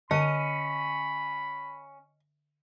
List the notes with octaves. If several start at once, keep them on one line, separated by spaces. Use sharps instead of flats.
D3 C#4 D#5 B5